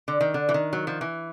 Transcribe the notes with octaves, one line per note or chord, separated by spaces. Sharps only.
D3
D#3
D3
E3
D#3
F#3
F3
E3